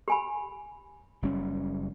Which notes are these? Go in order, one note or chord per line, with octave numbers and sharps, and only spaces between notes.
G4 G#5 B5
F#1 G3 C#4